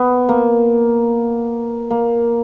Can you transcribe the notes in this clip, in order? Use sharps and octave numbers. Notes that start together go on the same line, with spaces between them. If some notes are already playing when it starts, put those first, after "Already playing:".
Already playing: B3
A#3
A#3